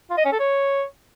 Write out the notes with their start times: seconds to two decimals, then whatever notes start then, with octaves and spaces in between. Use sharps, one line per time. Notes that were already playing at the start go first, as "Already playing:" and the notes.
0.10 F4
0.18 D#5
0.25 C#4
0.32 A4
0.39 C#5